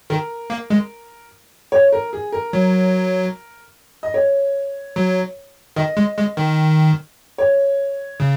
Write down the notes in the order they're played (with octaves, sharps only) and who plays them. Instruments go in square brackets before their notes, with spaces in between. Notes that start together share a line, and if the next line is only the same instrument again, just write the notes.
[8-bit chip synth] D#3 [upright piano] A#4
[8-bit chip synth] A#3
G#3
[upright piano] C#5
A#4
G#4
A#4
[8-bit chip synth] F#3
[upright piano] D#5
C#5
[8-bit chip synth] F#3
[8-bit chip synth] D#3 [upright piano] D#5
[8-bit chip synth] G#3
G#3
D#3
[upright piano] C#5
[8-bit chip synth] C#3